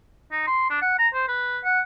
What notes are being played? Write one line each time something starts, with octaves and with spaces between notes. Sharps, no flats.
D#4
C6
D4
F#5
A#5
C5
B4
F#5